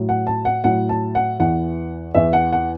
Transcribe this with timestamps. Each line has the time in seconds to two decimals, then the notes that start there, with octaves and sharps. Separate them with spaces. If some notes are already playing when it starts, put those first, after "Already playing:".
Already playing: A2 F#3
0.09 F#5
0.27 A5
0.45 F#5
0.64 A2 F#3 F#5
0.89 A5
1.15 F#5
1.40 E2 E3 F#5
2.14 E2 E3 E5
2.33 F#5
2.52 F#5